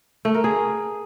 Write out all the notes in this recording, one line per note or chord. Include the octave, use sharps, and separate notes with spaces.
A3
A#4
G#4